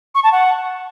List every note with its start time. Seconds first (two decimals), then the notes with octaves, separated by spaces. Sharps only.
0.15 C#6
0.23 A5
0.32 F#5